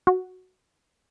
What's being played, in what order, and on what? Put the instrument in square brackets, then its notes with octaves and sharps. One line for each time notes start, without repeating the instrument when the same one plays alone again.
[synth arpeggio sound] F#4